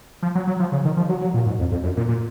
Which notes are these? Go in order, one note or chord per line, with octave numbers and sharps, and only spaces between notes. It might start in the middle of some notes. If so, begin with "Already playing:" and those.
F3
F#3
F#3
F3
C#3
D#3
F3
F#3
F#3
A#2
G#2
F2
F2
F#2
A#2
A#2